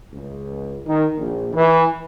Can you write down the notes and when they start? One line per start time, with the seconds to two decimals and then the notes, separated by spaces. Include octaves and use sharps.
0.13 C#2
0.86 D#3
1.18 A#1
1.54 E3